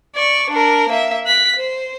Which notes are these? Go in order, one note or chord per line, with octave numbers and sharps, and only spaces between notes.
D5 C#6
D4 A#4
A#3 E5
F#6 B6
C5